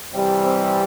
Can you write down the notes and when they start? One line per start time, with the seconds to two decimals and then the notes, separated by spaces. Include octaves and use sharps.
0.13 C3 E3 G3
0.45 C4